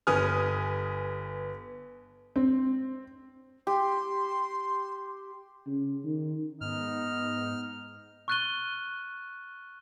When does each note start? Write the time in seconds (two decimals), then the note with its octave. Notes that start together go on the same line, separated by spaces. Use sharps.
0.07 G1 B4 G#5 D#6 F6
2.36 C4
3.67 G4 C6
5.67 C#3
6.04 D#3
6.61 G#2 B3 D#4 F6
8.28 C#6 F6 F#6 A6 D#7 G7